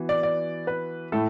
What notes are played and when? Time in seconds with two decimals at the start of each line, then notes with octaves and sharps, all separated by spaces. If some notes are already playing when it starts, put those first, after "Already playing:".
Already playing: E3 B3 F#4
0.09 D5
0.23 D5
0.67 B4
1.12 A2 A3 E4 A4